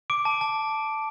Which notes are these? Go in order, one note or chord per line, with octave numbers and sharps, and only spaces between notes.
D6 D7
A5
A5